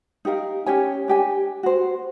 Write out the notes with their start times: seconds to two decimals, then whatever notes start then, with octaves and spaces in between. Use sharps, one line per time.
0.25 D#4 G4 A#4 F5
0.66 C#4 G4 C#5 G#5
1.08 D4 G4 G#5
1.63 F#4 C5